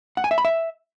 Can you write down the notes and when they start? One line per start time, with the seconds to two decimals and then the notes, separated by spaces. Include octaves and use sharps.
0.17 F#5
0.24 G#5
0.31 E5
0.38 B5
0.45 E5